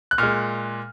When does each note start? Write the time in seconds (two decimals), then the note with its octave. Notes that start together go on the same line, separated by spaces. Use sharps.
0.11 F#6
0.18 A#2 G#3 F6